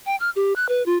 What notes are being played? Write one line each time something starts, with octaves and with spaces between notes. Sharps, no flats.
G5
F6
G4
F#6
B4
F4